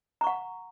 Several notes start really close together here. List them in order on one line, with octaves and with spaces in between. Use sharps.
A#5 C#6 F#5